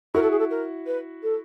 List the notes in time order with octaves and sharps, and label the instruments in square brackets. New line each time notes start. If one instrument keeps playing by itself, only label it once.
[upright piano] E4 F#4 [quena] A#4
[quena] A4
G#4
A4
A#4
B4
A4